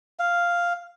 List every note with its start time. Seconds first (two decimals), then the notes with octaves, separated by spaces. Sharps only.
0.19 F5